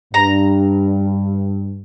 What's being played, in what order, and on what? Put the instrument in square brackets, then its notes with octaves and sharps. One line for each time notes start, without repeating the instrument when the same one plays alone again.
[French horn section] G2 [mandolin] A#5